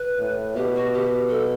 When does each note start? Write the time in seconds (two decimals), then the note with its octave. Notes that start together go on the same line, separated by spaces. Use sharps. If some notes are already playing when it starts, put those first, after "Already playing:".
Already playing: B4
0.19 A2
0.55 B2 G4
0.75 F#4
0.93 G4
1.29 A4